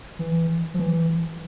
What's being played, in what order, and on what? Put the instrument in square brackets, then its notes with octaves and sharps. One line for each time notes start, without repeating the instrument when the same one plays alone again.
[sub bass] E3
F3
E3